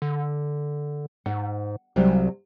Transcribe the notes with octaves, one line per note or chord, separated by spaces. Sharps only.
D3
G#2 F#5
C2 C3 F#3 G3